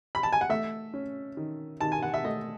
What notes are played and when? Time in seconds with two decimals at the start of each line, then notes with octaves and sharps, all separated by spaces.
0.15 B5
0.23 A5
0.33 G#5
0.41 F#5
0.49 A3 E5
0.94 C#4
1.37 D#3
1.81 D#3 A5
1.92 G#5
2.03 F#5
2.14 E5
2.24 A3 D#5